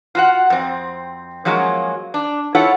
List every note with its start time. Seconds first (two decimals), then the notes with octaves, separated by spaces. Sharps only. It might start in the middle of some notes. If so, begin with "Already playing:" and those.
0.15 F4 F#4 F#5
0.50 F2 C4
1.45 F3 F#3 G#3 A#3 C#4
2.14 D4
2.55 E4 F4 A4 C#5 F#5